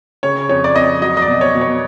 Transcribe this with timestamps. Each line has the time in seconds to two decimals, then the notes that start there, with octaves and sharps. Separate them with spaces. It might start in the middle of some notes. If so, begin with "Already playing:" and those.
0.23 C#3 C#5
0.49 F2 C#5
0.64 D5
0.76 F2 D#5
1.02 F#3 D#5
1.17 D#5
1.22 D5
1.28 B2
1.41 C#5
1.55 B2
1.61 C#5